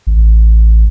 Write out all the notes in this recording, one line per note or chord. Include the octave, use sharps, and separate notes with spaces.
A1